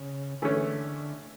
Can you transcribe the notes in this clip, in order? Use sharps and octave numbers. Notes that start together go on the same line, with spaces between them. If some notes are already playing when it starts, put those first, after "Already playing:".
Already playing: C#3
D3 E3 A3 C#4